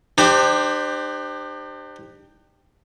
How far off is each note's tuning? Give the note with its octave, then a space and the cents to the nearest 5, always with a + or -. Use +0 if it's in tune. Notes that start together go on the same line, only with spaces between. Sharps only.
D4 +40 G4 +10 C5 +0